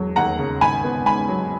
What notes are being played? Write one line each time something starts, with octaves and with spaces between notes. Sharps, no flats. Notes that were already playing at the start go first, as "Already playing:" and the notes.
Already playing: E1 F#3
D#2 F#5 A#5
C#3
G#1 G#5 B5
B3
G#2 G#5 B5
F#3